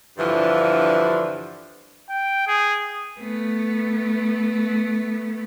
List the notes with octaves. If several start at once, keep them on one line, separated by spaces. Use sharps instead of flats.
G2 D3 E3 F3
G5
G#4
A3 B3